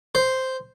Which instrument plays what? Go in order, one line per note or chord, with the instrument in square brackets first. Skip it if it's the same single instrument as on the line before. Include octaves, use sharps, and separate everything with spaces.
[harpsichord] C5